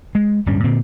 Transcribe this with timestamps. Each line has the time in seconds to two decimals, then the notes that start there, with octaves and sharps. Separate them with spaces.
0.15 G#3
0.46 D1 G2 G3 C#4
0.64 A#2 D3 C4